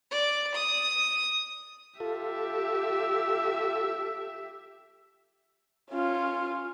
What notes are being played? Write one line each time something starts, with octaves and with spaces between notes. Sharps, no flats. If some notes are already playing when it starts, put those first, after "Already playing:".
D5
D#6
F4 G4 A4 E5
C#4 F4